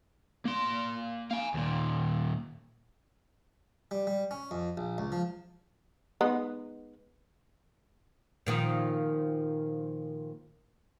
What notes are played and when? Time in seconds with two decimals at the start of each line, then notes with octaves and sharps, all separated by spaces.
0.45 A#3 C6
1.31 F5 G#5
1.54 D#2 A#2
3.91 G3
4.07 G3
4.31 C#4
4.51 F2
4.77 A#1
4.98 C#2
5.12 F3
6.21 G#3 B3 D#4
8.46 A#2 D#3 F3